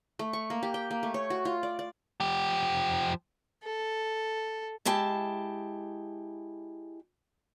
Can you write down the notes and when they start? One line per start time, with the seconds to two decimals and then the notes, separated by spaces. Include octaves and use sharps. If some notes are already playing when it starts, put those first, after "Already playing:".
0.19 A3
0.33 C#6
0.50 A#3
0.63 G4
0.74 G5
0.91 A#3
1.03 A3
1.14 C#5
1.30 F#4
1.45 F4
1.63 D5
1.79 D5
2.20 F3 G4
3.64 A4
4.85 G#3 E4 G4 A5